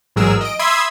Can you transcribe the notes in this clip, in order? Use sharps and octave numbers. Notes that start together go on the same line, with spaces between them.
A1 G#2 F#3 G#4 A#4 E6
D#5 D7
E5 B5 C6 D#6 E6 G#6